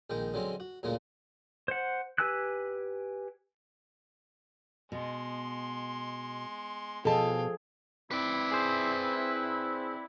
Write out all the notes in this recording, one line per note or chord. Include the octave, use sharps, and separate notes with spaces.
A#1 D#3 G#3 G5
D3 F#3 G#3 C4 C#4
F#4
D2 A#2 C#3 G#3 A#3
C5 F#5
G4 B4 G#5 E6 F#6
B2 G#3 C6
B2 F3 G#4 A4 F5 G5 A5
C4 E4 B4 D5
G#4 C5